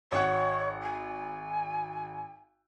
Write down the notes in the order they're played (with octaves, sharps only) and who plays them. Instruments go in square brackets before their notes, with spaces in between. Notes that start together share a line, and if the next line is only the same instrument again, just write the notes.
[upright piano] G#1 F#5 [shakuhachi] C#5
[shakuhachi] G#5